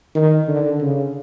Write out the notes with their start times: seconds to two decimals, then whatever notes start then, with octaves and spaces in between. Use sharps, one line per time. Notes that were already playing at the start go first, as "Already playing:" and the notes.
0.15 D#3
0.48 D3
0.81 C#3